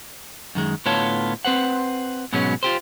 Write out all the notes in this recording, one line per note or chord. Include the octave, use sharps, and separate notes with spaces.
F#2 D#3 G#3
A2 D3 B3 F4 C#5 A5
C4 B4 C5 F#5
G#2 B2 F#3 G#3 B3 C#4
F4 G4 C5